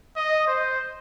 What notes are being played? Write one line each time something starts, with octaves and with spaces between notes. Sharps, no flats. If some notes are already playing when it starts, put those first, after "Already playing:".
D#5
C5